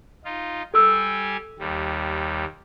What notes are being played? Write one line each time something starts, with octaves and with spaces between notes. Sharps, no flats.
D#4 F4
G3 G4 A4 G#5 E6
D#2 G3